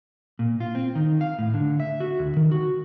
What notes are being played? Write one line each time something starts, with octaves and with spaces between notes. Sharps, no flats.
A#2
F4
C4
D#3
F5
A2
D3
E5
F#4
D2
D#3
F#4